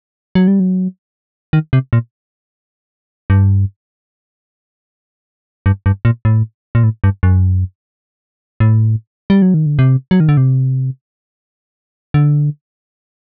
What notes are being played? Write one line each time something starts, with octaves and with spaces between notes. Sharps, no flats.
F#3
G3
F#3
D#3
C3
A#2
G2
G2
G2
A#2
A2
A#2
A2
G2
F#2
A2
G3
F#3
D#3
D3
C3
F#3
D#3
D3
C3
D3